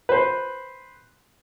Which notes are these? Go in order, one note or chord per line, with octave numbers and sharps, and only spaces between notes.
B4 C5